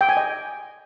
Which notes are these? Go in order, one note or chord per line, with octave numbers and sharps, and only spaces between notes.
G5
G#5
D#5